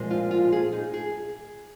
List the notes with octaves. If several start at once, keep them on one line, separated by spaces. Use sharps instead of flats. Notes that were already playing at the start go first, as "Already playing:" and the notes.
Already playing: A#2 F3 G#3 C4
F4
F4
G#4
D#4
G#4